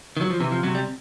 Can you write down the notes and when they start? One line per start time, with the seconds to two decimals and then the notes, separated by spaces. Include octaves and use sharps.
0.17 D#3
0.21 F#3
0.30 F3
0.40 C3 E3
0.52 F3
0.63 C3 F#3
0.75 G3